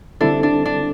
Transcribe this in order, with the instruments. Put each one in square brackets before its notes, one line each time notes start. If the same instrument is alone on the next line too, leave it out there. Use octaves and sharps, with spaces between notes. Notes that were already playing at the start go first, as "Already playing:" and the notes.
[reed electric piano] D3 G3 C4 E4 A4 [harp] D4
[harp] D4
D4